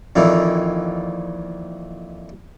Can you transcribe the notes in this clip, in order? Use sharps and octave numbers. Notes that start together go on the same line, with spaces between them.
F2 A#2 D#3 E3